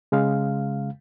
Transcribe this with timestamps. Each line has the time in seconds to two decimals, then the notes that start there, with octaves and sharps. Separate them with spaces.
0.12 C#3 G#3 F5